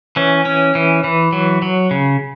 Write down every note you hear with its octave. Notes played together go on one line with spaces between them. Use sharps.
E3 C#4
C#4
E3
E3
F#3
F#3
C#3